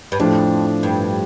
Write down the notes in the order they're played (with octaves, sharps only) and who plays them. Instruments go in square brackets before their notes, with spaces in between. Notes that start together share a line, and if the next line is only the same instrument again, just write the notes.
[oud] G2
[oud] F2 [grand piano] A2 F3 A3 D4
[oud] G2